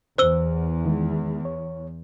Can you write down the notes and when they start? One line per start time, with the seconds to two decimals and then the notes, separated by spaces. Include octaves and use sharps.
0.18 E2 C5 E6 G7
0.85 D#3 G#3
1.45 C#5